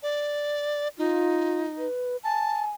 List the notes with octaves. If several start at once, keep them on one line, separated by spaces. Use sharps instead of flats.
D5
D#4 F4
B4
G#5 A5